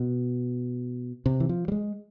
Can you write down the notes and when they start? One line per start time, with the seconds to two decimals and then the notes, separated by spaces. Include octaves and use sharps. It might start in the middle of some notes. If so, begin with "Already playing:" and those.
Already playing: B2
1.26 C3
1.40 E3
1.49 F3
1.68 G3
1.72 G#3